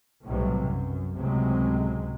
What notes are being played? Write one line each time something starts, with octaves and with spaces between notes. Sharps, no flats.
B1 A2 C3 E3 F#3 G3
F#2
C#2 A2 C3 F#3 G#3